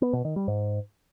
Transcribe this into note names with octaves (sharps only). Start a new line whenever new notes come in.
B3
B2
D#3
G3
G#2